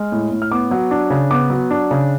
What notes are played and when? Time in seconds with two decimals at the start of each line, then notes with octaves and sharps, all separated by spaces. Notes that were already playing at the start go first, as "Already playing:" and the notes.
Already playing: G#3 F6
0.12 A2
0.32 A2
0.42 F6
0.51 B3 D6
0.71 F#3
0.91 D4
1.10 C#3
1.31 B3 D6
1.50 F#3
1.71 D4
1.91 C#3